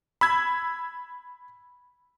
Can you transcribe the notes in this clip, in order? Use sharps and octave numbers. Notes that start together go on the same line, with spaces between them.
B5 E6 G#6